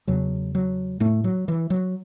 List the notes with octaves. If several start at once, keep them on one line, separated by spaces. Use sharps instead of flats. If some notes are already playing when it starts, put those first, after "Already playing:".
E2 C#3 F#3
F#3
A2 A3
F#3
E3
F#3